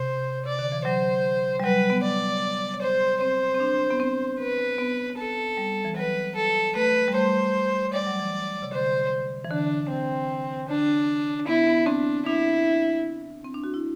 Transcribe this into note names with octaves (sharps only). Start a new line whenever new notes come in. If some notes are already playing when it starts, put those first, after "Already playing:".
Already playing: C3 C5
C3 D5
D3
E3
F#3 C5
G3
F#3 B4
B3
D5
C5
C4 C5
C4
D4
B3
C4
B4
B3
A4
G3
E3
F#3 B4
A4
A3 B4
G3
A3 C5
G3 D5
F#3
E3
C3
D3 C5
E3
D3 D4
C4
D3 D4
B3 E4
B3
C4 D4
D4 E4
C4
D4
F#4
E4